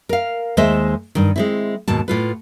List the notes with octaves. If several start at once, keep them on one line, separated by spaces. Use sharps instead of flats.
A#4 F5
D#2 G#3 C5 D#5 E5
G2 D#3
G#3 C4 E4
D#2 G#2 B2 A5
A2 F4 B4